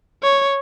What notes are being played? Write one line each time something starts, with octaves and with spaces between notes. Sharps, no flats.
C#5